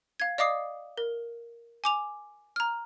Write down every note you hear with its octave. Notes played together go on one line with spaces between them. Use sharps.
F5 G#6
D5 D#5 F5 D6 D#6 C7
A#4
G#5 D6 F7
A#5 F6